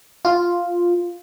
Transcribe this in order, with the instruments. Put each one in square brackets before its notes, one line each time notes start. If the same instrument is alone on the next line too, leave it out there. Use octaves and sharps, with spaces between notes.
[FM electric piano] F4